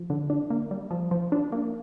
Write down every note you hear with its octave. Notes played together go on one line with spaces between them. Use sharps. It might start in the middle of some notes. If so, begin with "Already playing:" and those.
Already playing: F3
D3
D4
A#3
G3
F3
F3
D4
A#3